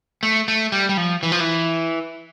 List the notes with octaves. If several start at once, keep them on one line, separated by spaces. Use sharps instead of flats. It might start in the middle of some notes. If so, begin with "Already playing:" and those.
A3
A3
G3
G3
F3
E3
F3
E3